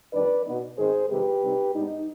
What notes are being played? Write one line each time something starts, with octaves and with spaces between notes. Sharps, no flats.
F2 D#3 G3 D4 B4 D5
B2 B3 D#4
G#2 D#3 G#3 C4 G#4 C5
F2 C3 D#3 G#3 G4 B4
C3 G3 C4 D#4
G#2 G3 B3 D4 D#4